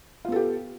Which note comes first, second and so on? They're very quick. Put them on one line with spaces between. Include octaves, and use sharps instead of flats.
F4 B3 A4 G4